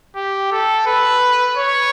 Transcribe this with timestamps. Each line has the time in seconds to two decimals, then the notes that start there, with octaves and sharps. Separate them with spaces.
0.16 G4
0.52 A4
0.87 B4
1.57 C#5